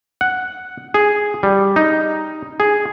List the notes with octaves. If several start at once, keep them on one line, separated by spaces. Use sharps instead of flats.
F#5
G#4
G3
D#4
G#4